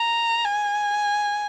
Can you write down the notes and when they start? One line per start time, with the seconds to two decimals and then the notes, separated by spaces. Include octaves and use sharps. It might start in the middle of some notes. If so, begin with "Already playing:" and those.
Already playing: A#5
0.45 G#5